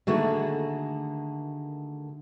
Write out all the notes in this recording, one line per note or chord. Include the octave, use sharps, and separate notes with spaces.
D3 D#3 A3 A#3 F#4 G#4